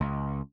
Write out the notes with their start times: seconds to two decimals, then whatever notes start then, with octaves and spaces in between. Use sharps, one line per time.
0.01 C#2